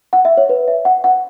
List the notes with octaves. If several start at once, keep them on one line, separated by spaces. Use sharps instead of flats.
F#5
E5
C#5
B4
E5
F#5
F#5